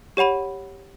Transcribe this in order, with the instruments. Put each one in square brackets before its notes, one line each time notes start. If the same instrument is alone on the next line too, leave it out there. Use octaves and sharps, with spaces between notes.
[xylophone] G4 C#5 F#5 B5 D#7